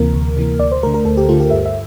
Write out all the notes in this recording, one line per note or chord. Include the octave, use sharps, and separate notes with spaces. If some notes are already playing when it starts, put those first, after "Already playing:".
Already playing: D2 C3 E3 A#3 A#4
D2
C3 E3 A#3
D2 D5
C5
D3 A3 A#4
A#4
D2 A4
G4
D3 A3 F4
G4
G2 E5
E5